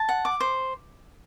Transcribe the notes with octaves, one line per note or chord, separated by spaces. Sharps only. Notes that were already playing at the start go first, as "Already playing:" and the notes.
Already playing: A5
F#5
D6
C5